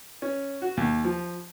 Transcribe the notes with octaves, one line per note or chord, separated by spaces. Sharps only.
C#4
F#4
D#2
F3